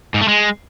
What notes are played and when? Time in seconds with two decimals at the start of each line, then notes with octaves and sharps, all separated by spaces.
0.14 G#2
0.21 A3
0.28 G#3